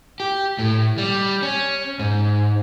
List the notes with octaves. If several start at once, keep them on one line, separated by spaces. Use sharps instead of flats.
G4
A2
G3
C#4
G#2